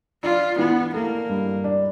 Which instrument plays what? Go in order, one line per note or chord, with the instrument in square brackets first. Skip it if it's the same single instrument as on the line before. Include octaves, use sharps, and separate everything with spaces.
[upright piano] D4 [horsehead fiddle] F4
[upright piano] E3 [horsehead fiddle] B3
[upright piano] A3 [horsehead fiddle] A#3
[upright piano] G2
D4